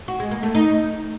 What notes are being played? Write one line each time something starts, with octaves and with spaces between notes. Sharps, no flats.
F#4
G#3
A#3
A3
D#4